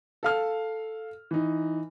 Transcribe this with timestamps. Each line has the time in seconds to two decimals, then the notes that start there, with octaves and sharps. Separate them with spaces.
0.23 A4 F5 F6
1.31 E3 D#4